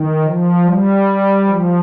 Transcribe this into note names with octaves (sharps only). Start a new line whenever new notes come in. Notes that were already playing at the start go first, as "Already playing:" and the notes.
Already playing: D#3
F3
G3
F3